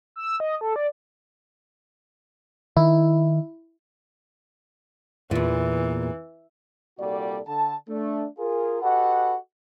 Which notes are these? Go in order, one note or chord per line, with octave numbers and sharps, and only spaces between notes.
E6
D#5
A4
D5
D#3 E4
E2 A#2 E3
C2 A#2 G3 F#4 A4 D5
D3 A5
A3 D4
F4 G#4 A#4
F#4 G4 A4 B4 D#5 F#5